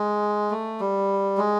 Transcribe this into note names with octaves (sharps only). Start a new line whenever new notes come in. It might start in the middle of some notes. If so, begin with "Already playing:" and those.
Already playing: G#3
A3
G3
G#3